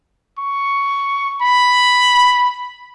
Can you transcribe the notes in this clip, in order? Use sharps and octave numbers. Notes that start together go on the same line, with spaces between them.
C#6
B5